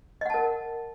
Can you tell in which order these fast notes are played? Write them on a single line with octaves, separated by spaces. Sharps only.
D#5 F#5 A5 A#4